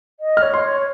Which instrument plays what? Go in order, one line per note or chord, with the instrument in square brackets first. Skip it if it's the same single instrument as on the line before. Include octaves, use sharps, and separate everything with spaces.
[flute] D#5
[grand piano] F6
[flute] C#5
[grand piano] C6
[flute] C#5